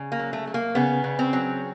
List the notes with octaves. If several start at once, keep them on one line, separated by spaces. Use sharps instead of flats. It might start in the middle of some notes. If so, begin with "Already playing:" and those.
Already playing: C#3
A#3
F#3
A3
A3
A#3
C#3 B3
C#3
C4
F#3